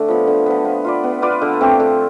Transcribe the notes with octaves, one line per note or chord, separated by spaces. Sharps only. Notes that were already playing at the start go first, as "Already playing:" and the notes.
Already playing: D3 A3
F3 B3
D3
F3 B3
B3
F4 B4 D5
B3
F4 B4 D5
D3
A3 C4 G4
D3